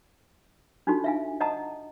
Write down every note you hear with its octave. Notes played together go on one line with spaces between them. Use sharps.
D4 D#4 F4 F#4 A4
E5 F5 G#5
D#5 F#5 A5 A#5 D#6